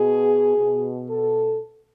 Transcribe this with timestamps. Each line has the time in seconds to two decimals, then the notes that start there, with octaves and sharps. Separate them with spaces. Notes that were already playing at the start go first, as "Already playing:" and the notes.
Already playing: B2 G#4
0.56 B2
1.10 A4